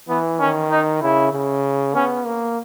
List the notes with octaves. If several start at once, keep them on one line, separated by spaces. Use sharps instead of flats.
E3 B3
D#3 C#4
D#4
C#3 E4
C#3
B3 C#4
A#3